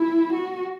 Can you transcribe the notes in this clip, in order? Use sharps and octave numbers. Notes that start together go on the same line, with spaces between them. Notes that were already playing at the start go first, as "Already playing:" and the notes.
Already playing: E4
F#4